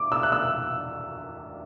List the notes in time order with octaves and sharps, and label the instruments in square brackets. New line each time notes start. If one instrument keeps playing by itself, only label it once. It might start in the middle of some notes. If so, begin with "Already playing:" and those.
Already playing: [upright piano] D6
E6
F#6
E6